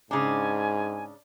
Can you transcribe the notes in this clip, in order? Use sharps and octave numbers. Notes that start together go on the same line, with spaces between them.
G#2 C#3 D4 G#5